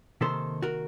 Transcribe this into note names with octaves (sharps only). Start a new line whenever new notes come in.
C3 D#3 A#3 A4 C5
F#4 A#4